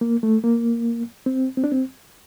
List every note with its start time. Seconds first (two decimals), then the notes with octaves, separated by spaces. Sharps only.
0.01 A#3
0.23 A3
0.44 A#3
1.26 C4
1.57 C4
1.64 D4
1.72 C4